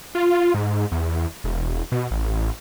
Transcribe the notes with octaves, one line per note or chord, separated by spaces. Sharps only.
F4
G#2
E2
E1
B2
A1